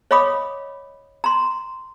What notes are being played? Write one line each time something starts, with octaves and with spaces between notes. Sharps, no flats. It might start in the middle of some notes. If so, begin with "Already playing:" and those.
C#5 D#5 F5 B5 D6 D#6
A#5 C6